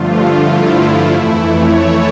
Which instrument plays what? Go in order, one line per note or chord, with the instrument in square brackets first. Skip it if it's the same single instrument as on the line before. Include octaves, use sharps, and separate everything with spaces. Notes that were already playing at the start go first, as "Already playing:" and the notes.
Already playing: [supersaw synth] G2 D3 F3 A3 F4
E4
F2 E3 A3
C#5
A4